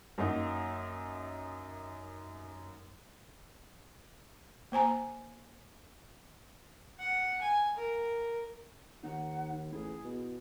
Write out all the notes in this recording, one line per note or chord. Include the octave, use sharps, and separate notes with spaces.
F#2 A#3 D#4
A#3 C5 G#5 A#5
F#5
G#5
A#4
D#2 D#4 F#5
A1 E4 G#4
B2